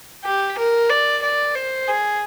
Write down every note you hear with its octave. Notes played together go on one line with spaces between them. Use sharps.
G4
A#4
D5
D5
C5
G#4